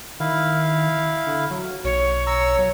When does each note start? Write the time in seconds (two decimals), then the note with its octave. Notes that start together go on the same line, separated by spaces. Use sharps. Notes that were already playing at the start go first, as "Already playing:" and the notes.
0.20 D#3 E4 F5
1.27 D3
1.51 F#3
1.85 B1 C#5
2.27 A#5 E6
2.59 F#3